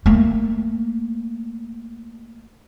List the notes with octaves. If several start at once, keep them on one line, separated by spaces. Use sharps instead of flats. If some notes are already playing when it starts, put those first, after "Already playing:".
A3 A#3